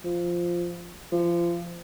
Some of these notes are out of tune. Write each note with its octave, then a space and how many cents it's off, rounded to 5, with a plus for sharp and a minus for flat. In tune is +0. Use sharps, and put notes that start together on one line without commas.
F3 -5
F3 -25